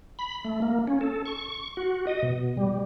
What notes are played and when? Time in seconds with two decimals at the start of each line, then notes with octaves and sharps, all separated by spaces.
0.19 B5
0.44 A3
0.62 A#3
0.88 C#4
1.01 A4
1.26 C#6
1.77 F#4
2.07 D#5
2.23 B2
2.57 G3